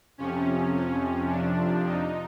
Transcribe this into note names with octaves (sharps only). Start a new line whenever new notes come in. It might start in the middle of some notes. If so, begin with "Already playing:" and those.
F2 C3 F3 C#4
C#4
D4
D#4